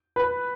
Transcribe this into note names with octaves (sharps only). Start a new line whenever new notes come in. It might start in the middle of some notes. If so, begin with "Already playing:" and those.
B4